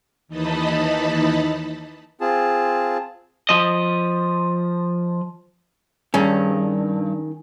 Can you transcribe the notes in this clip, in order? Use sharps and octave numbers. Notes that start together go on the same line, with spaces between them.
D#2 E3 D#4 D#5 A5 B5
C4 F4 G#4 A5
F3 D#5
G2 D#3 C#4 G#4